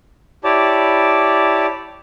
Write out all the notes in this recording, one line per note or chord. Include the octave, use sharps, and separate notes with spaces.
E4 G4 C#5 D5 A5 D6